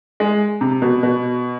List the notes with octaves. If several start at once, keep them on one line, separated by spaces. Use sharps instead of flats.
G#3
C3
B2
B2